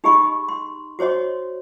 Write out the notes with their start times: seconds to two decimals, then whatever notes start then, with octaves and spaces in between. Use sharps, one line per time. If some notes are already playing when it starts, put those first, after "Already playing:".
0.04 D#4 G4 G#4 D#5 B5 C#6
0.48 C6
0.99 F#4 C5 C#5 D#5 C6